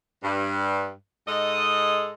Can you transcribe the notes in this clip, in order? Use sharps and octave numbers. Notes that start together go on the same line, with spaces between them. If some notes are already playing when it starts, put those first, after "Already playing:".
G2
G#2 G#3 A4 D#5